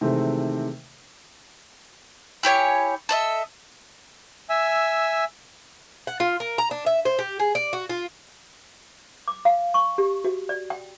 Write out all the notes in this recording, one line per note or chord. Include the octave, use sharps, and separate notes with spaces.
C3 D#3 E3 G#3 A3 C4
E4 G4 C#5 G#5
A4 D#5 E5
E5 G#5 E6
F#5
F4
A#4
A#5
D4
E5
C5
G4
G#4
D5
F#4
F4
D6
F5
C#6
G4
F#4
D5
G5